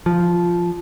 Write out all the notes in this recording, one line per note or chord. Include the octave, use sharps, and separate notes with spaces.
F3